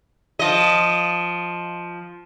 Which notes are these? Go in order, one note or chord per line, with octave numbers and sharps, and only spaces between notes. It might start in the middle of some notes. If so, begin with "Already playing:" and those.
F3 D#5